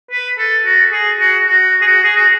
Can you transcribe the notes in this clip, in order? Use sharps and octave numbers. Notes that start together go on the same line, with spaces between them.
B4
A4
F#4
G#4
F#4
F#4
G#4
F#4
G#4
F#4